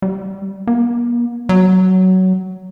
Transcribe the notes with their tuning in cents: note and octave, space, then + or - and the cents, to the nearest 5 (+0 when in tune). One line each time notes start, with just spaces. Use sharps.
G3 -10
A#3 +45
F#3 +15